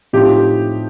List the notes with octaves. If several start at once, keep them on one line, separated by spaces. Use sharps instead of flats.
A2 F3 C4 D#4 G4